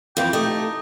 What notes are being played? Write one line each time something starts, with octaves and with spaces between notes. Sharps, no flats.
F2 E3 G5
A3 D#4 G4